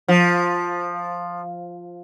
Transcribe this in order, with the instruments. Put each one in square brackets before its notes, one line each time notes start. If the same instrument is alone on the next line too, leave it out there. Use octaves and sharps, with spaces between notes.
[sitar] F3